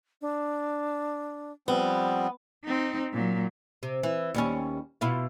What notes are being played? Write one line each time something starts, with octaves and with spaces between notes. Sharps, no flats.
D4
F3 G3 B3 C4
C4 D#4
A#2 F#3
C3
E3
D#2 G3 C#4
B2 E4 F4